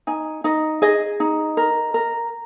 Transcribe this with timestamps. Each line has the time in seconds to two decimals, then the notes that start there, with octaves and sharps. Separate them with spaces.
0.07 D#4 G#5
0.44 D#4 D#5
0.82 G#4 D#5
1.20 D#4
1.57 A#4
1.94 A#4